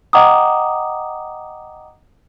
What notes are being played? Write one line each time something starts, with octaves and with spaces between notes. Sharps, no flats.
D#5 F#5 G5 A#5 D6 D#6